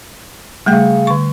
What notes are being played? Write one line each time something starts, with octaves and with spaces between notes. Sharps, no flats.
C#3 G3 A3 G5
D3 C#6